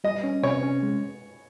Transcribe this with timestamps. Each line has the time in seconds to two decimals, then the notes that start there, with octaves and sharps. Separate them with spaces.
0.04 G3 D#5
0.24 C#4
0.43 C3 C#5
0.63 C#4
0.83 G#3